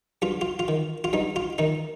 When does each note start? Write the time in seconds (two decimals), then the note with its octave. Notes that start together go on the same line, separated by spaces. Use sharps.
0.22 G2 F4
0.41 F4
0.59 F4
0.68 D#3
1.04 F4
1.13 G2 D#4
1.36 F4
1.58 D#3 D#4